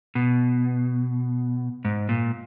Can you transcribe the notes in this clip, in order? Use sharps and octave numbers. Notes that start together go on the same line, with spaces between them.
B2
G#2
A#2